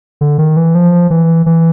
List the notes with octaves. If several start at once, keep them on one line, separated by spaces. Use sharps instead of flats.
D3
D#3
E3
F3
E3
E3